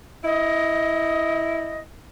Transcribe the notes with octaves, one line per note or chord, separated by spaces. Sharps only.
E4 D#5